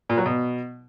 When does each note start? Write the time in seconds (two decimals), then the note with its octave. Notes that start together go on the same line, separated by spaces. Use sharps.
0.09 A#2
0.18 F#3
0.26 B2